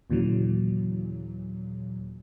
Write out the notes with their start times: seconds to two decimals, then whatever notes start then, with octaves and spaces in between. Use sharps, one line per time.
0.10 D#2 A#2 C#3 E3 F#3